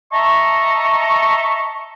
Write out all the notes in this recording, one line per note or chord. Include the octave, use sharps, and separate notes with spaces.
D#5 E5 A5 A#5 C#6